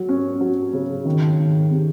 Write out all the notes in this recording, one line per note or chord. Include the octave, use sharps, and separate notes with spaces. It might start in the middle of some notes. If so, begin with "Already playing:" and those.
Already playing: F#3
C#4
F#3
C#3
D#3
D#3
C3